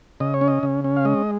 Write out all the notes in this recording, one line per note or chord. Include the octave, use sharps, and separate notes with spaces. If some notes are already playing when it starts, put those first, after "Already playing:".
C#3 D#5
C#5
C#4
D#5
C#3
C#4
F5
G#3 D#5